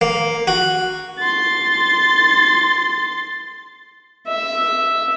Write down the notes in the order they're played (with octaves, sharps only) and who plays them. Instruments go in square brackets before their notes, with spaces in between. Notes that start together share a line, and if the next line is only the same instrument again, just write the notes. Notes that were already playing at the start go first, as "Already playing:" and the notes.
[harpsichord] A#3
F#4
[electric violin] C6 A6
[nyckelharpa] E5